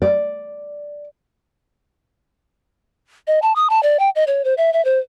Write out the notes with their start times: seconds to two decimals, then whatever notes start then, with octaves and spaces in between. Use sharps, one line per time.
0.02 D5
3.27 D#5
3.42 A5
3.56 D#6
3.70 A5
3.83 D5
3.99 G5
4.16 D#5
4.27 C#5
4.45 C5
4.58 E5
4.73 E5
4.85 C5